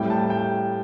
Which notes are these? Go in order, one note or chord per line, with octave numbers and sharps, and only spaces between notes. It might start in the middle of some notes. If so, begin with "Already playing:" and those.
Already playing: A2 G3 C4 E4 G5
A5
G5